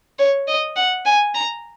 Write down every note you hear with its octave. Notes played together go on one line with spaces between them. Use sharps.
C#5
D#5
F#5
G#5
A#5